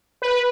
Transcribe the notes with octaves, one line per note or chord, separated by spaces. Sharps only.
B4